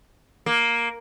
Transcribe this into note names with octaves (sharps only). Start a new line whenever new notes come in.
A#3